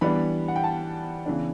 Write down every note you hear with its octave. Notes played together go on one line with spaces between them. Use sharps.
E3 G3 B3 D4 B5
F#5
G5
A5
C#3 E3 B3 D4